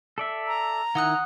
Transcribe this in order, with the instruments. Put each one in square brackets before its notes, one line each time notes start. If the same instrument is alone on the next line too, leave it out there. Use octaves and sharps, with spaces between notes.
[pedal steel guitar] A4 D5 E5
[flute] A#5
[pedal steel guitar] D#3 E4 [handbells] F#5 D#6 F#6